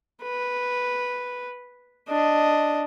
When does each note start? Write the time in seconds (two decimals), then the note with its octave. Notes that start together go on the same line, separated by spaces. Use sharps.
0.23 B4
2.09 D4 D#5